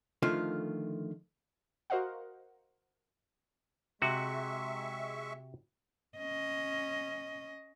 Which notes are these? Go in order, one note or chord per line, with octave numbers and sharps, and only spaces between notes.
D3 D#3 F3 A3 F4
F#4 A#4 C5 D#5 F5 F#5
C3 G#3 F#4 E5 C#6
C#4 D#5